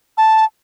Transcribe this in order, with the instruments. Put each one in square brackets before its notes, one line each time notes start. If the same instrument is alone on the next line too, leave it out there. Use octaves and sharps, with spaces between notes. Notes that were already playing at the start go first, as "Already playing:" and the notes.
[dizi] A5